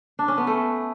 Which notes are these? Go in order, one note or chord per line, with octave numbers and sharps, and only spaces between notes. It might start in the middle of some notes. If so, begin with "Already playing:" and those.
D4
C#4
B3
A3